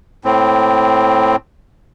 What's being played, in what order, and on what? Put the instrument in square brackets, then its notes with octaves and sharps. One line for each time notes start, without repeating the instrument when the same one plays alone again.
[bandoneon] A2 C4